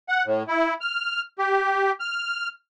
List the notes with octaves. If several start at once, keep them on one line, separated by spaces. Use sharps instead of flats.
F#5
A2
E4
F6
G4
F6